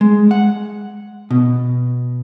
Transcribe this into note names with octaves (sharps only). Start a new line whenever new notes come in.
G#3
F#5
B2